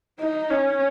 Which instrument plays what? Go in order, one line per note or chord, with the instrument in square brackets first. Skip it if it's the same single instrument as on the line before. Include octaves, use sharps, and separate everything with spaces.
[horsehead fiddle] D#4
C#4